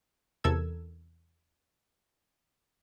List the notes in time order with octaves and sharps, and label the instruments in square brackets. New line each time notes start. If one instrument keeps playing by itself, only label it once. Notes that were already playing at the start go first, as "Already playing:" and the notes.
[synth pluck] E2 C3 A4 A#4 E6 G#6